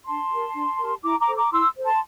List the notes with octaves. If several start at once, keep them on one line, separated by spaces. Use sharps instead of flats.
D4 A5 C6
G4 A#4
D4
G4 A#4
E4 A#5 D6
A#5 D6
A4 C5
A#5 D6
E4 C6 E6
A4 C5
A5 C6